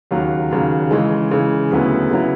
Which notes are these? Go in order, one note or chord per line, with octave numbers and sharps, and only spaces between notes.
D#2 C#3 F#3
D#2 C#3 F#3
C#3 E3 G#3
C#3 E3 G#3
D2 C#3 F#3 B3 E4
C#3 F#3 B3 E4